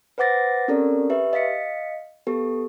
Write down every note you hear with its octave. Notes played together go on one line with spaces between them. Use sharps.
B4 C5 F#5 D6 A6 A#6
C4 C#4 G4 A4 A#4 D5
G4 B4 E5
D#5 F5 B6 C#7
B3 G4 A4